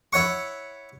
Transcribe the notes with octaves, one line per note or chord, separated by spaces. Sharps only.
E4 C#5 F#5 C#6